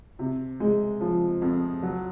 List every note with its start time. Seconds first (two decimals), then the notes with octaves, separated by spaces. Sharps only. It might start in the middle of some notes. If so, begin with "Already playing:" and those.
0.19 C3
0.60 G#3
1.01 F3
1.42 F2
1.83 F#3